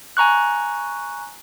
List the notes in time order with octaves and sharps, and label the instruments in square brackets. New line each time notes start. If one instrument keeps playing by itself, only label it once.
[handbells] G#5 A#5 C#6 F#6